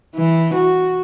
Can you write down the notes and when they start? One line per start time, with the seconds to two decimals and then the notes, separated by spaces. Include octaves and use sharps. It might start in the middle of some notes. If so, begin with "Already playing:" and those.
0.15 E3
0.54 F#4